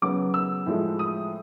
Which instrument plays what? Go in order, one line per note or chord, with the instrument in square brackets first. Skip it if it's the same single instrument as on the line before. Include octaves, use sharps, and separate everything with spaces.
[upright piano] C#3 F#3 B3 D6
E6
A2 F3 G#3
D#6